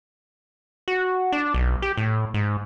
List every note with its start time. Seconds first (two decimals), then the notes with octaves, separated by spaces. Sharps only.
0.88 F#4
1.32 D4
1.54 B1
1.82 G4
1.97 A2
2.34 G#2